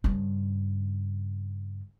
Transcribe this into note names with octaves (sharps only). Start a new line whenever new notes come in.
G2 C#3